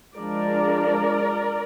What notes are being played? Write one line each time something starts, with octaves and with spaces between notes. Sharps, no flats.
F3 G#3 D4 A#4 D5